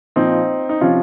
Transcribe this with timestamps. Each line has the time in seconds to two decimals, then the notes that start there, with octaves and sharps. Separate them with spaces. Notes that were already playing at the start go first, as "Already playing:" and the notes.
0.16 A#2 F3 C4 D#4
0.69 D#4
0.81 C3 F3 C#4 F4